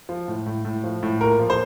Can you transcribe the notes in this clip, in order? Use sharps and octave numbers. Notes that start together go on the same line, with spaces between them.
F3
A2
A2
A2
F3
A2
A#2 A#4
F3
C5